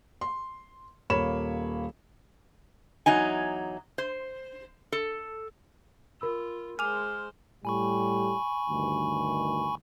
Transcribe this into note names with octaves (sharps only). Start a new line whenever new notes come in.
C6
D#1 A#3 C#5 B5 E7
E2 F#3 D#4 G#5
C5
A4
F4 A#4 B5 E6
G#3 C5 G#5 D6 F6 F7
A2 G3 G#5 B5 C#6
D2 G2 D#3